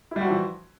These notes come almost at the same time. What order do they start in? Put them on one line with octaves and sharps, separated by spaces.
E4 G3 F#4 F3 E3